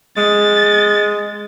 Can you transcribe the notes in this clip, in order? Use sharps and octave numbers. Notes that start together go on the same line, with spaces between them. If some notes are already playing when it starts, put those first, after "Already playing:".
G#3 A6